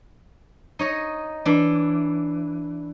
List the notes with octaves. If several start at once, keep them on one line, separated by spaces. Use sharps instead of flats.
D#4 C#5 D#5
E3 D4